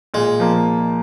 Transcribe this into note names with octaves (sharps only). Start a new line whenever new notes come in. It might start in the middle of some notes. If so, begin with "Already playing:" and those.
A#2 G#3
F3 A#3